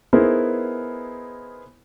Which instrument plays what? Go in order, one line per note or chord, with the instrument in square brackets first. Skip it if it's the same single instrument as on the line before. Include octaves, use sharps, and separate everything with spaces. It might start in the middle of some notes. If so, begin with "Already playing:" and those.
[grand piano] B3 D#4 E4 G#4 A#4 C5